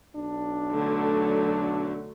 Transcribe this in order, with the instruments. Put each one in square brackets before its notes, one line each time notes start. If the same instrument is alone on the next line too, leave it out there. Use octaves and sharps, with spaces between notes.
[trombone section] B1 D4
[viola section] D3 F#3 A3